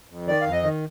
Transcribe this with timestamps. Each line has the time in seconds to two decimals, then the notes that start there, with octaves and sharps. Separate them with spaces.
0.10 F2
0.27 D#3 D5
0.41 F2 F5
0.52 D#5
0.63 D#3